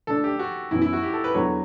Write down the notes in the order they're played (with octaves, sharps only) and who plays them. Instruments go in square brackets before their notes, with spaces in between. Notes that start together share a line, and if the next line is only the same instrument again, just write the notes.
[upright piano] D3 A3 D4 [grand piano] A4
[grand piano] G4
F#4
[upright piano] F#2 E3 B3 [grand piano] E4
[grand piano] E4
F#4
G4
A4
B4
[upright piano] E2 D3 F#3 B3 F#4 [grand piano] C#5